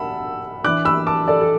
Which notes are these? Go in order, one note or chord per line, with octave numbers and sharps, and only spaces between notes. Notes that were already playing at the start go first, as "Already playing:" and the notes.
Already playing: F#5 A5 B5 E6
E3 D4 D6 F#6
B5 E6
A5 D6
A4 D5
A4